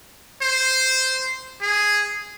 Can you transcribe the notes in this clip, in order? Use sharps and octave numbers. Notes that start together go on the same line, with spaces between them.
C5
G#4